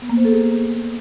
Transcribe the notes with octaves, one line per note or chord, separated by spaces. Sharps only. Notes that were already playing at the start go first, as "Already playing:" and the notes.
B3
A#3
C5
A4
G#4